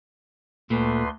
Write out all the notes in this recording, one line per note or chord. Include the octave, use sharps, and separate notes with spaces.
D2 A#2 A3 B4 C6